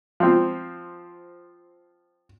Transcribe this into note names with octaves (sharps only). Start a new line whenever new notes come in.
F3 C4